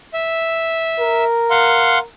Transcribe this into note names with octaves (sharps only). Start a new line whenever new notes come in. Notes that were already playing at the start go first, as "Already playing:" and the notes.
E5
A#4
F5 F#5 C6